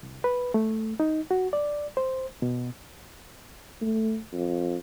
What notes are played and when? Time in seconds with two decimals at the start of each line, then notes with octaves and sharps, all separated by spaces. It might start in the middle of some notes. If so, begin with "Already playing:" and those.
0.03 C2
0.24 B4
0.54 A3
1.00 D#4
1.31 F#4
1.53 D5
1.97 C5
2.42 B2
3.81 A3
4.33 F2